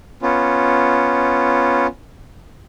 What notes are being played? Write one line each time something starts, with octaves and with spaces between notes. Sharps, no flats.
B3 C#4 F4